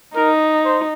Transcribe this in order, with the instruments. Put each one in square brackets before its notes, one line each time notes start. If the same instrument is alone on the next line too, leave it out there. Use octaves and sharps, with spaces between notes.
[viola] D#4 [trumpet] A#4
[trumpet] C5